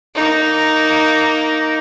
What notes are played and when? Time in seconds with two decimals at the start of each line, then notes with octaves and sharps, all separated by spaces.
0.15 A#3 D#4